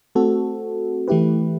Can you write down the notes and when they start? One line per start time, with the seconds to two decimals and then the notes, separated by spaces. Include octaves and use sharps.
0.15 A3 C4 F#4 A4
1.08 E3 A3 E4 G4 B4